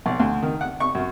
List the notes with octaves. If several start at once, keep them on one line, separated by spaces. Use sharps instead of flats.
B1
D2
D#3
F#5
C#6
F#2